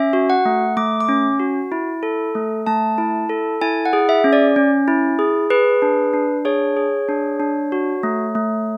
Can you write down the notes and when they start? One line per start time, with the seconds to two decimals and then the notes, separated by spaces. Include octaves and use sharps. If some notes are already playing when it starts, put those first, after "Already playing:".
Already playing: C#4 E5
0.13 F#4
0.30 F#5
0.45 A3
0.77 A3 D6
1.01 D6
1.09 C#4
1.40 F#4
1.72 E4
2.03 A4
2.35 A3
2.66 A3 A5
2.98 E4
3.29 A4
3.61 E4 G#5
3.85 F#5
3.93 G#4
4.09 E5
4.24 C#4
4.33 D5
4.56 C#4
4.88 E4
5.19 G#4
5.50 G#4 B4
5.82 D4
6.14 D4
6.45 G#4 C#5
6.77 G#4
7.09 D4
7.40 D4
7.72 F#4
8.03 A3
8.35 A3